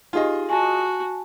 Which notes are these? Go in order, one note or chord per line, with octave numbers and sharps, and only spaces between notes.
D#4 F4 G4 G#4 D#5
F#4 G#5 A5